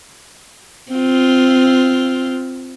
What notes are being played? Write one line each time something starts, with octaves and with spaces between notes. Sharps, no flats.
C4 F4